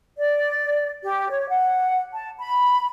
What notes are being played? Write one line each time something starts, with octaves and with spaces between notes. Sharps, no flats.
D5
G4
C#5
F#5
A5
B5